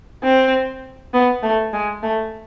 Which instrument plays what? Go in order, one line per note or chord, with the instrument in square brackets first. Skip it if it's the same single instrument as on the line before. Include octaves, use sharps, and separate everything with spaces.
[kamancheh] C4
B3
A3
G#3
A3